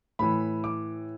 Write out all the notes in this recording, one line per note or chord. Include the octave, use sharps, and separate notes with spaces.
A2 E3 B5
D6